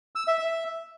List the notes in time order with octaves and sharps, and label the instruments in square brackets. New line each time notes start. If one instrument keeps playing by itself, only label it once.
[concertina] E6
E5
E5